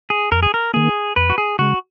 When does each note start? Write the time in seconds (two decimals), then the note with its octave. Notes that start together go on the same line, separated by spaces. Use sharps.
0.10 G#4
0.32 F2 A#4
0.43 G#4
0.54 A#4
0.74 D#3 A#3 G#4
1.16 F2 B4
1.30 F#4
1.38 G#4
1.59 C#3 G#3 F#4